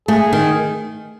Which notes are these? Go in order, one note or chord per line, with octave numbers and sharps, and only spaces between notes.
A3 G#4
D#3